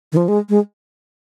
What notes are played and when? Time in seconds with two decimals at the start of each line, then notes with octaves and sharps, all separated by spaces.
0.12 D#3
0.17 F3
0.28 G#3
0.49 G#3